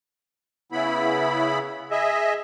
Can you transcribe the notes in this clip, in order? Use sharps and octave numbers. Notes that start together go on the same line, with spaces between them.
C#3 B3 E4 B5
G#4 D#5 E5